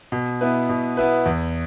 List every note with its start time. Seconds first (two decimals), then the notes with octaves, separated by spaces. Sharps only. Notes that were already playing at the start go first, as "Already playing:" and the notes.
0.12 B2
0.41 B3 E4 B4
0.69 B2
0.97 B3 E4 B4
1.26 E2